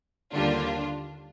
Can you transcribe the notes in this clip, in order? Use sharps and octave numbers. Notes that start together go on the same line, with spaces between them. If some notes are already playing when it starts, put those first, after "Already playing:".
D#2 D3 G3 A#3 D4 F4